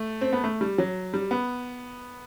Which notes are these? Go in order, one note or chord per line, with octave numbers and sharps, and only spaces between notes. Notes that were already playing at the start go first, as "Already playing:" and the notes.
Already playing: A3
C4
B3
A3
G3
F#3
G3
B3